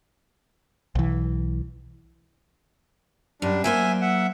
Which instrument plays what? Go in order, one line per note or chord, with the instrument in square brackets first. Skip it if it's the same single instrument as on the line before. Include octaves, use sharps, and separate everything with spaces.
[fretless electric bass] B1 E3
[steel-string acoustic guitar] F#2 [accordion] G3 D4
[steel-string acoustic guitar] F#3 A#3 C5 [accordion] E5 G#5
[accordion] E5 F#5